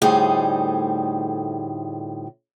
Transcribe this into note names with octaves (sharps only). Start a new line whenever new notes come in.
D2 A2 G3 D#4 G#4 C5